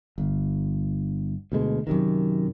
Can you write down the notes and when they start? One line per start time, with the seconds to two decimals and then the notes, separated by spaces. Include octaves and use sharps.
0.18 G1
1.52 D2 B2 G#3
1.87 F#2 C3 D#3